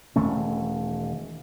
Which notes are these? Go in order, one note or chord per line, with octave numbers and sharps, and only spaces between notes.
E1 D#3 A3 C#4